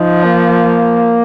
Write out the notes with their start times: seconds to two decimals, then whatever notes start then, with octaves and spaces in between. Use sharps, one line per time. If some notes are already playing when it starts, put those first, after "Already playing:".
Already playing: F3 D#4
0.24 A#3